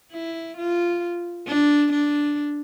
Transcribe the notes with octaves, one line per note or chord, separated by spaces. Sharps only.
E4
F4
D4
D4